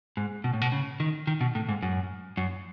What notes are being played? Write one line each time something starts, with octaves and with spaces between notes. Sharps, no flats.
G#2
B2
A2
B2
C#3
D#3
D#3
B2
A2
G#2
F#2
F#2